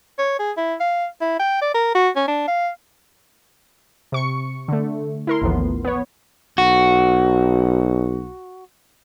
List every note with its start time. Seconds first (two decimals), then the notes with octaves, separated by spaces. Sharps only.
0.18 C#5
0.39 G#4
0.57 E4
0.80 F5
1.21 E4
1.39 G5
1.62 D5
1.74 A#4
1.95 F#4
2.16 C#4
2.28 D4
2.48 F5
4.12 C3 C#6 C#7
4.68 D3 A3
5.27 E4 A#4 C6
5.42 A1 D#2 A2 F3 B3
5.85 B3 C#5
6.58 B1 F#4